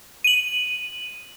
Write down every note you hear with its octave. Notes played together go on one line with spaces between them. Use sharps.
D#7 F#7